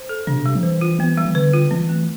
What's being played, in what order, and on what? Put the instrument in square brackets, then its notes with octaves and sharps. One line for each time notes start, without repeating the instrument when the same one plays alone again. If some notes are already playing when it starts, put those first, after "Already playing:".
Already playing: [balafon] C5
A4
[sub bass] C3 [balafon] D4
[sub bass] B2
[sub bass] C3 [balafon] G3
[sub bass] F3
[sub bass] E3 [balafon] C5
[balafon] F4
[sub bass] E3 [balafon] B3
[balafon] G3
[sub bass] E3
[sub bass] D3 [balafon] B4
[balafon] F4
[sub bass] E3 [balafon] C4
[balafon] A3